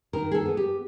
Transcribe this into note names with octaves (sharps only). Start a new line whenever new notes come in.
D#3 A#4
G#4
A4
B3
G4